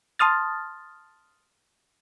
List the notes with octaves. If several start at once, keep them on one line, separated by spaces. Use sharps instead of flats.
A5 C6 D#6 F6 A6